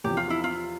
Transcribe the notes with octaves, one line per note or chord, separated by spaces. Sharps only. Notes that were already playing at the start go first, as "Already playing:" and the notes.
E2 C3 F3 G4
F4
E4
F4